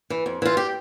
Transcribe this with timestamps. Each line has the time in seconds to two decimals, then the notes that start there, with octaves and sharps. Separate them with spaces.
0.10 E3
0.26 F2
0.42 E3 F4
0.57 G4